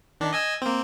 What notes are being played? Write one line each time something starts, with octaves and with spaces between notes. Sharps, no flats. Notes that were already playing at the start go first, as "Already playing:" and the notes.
D#3 D4
D#5 G#5 E6
A#3 C4